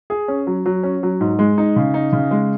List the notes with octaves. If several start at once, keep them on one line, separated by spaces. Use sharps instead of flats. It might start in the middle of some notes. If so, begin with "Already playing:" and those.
G#4
C#4
F#3
F#3
C#4
F#3
G#2
G#3
D#4
C#3
D#4
C#3
G#3